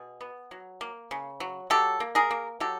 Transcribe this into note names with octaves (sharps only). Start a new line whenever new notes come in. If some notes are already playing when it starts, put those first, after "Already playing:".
Already playing: B2 G#4
B3
F#3
A#3
C#3
F#3
F#3 G4 A4
A#3
G#4 A#4
A#3
F#3 G4 A4